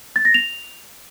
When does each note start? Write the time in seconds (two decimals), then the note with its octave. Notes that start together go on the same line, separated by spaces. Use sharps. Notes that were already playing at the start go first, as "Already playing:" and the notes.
0.16 A6
0.25 A#6
0.34 F7